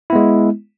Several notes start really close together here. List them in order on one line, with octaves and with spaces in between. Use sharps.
E4 B3 G#3